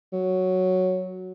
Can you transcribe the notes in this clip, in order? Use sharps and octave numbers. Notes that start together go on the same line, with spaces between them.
F#3